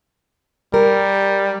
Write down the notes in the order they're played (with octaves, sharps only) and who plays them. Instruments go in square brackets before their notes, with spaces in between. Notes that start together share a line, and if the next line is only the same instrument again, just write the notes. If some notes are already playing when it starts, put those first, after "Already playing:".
[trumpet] G3 [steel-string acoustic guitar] A#4